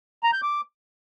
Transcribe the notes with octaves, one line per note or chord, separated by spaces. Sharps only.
A#5
G6
D6